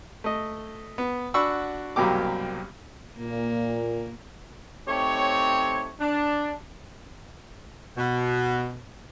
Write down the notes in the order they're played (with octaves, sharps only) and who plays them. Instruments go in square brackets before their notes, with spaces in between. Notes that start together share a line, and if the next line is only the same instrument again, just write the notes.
[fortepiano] A3 D#5
B3
D4 F#4 F#5 B5 C#6 E6
C2 F#2 B2 A#3 G4 D6
[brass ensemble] A#2 [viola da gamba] A#3
[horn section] A3 C4 D#4 G4 C#5
D4
[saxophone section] B2